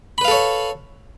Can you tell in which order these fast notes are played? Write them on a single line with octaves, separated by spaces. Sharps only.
B5 B4 F5 A4 C#5